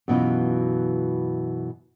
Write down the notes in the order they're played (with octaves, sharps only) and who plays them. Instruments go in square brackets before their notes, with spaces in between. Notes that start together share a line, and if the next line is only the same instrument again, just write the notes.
[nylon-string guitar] F#2 B2 E3 F4